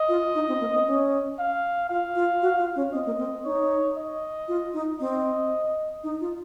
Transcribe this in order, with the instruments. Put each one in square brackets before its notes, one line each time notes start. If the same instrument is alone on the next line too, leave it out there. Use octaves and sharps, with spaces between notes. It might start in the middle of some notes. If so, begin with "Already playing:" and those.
Already playing: [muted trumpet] D#5
[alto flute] F4
D#4
C4
A#3
C4
C#4
[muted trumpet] F5
[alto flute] F4 [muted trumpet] F5
[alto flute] F4
F#4
F4
C#4
[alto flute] C4 [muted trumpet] D#5
[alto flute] A#3
C4
[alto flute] D#4 [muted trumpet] C#5
[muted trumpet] D#5
[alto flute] F4
D#4
[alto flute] C4 [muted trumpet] D#5
[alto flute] D#4
F4